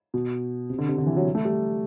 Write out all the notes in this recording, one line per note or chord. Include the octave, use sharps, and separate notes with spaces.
B2
C3
D3
C3
D3
E3
F#3
A3
G3